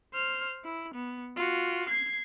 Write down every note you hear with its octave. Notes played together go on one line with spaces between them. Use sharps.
C5 F6
E4
B3
F4 F#4
G#6 C7